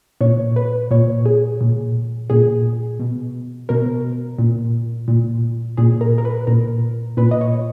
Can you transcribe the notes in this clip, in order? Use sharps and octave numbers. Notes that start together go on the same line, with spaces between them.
A#2 C#5
B4
A#2 C#5
G#4
A#2
A#2 G#4
B2
B2 A#4
A#2
A#2
A#2 G#4
A#4
A#4
B4
A#2 A#4
A#2 B4
D#5
C#5